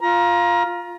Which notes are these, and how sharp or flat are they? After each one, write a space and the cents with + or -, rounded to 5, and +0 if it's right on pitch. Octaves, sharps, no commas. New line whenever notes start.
F4 +0 A#5 +30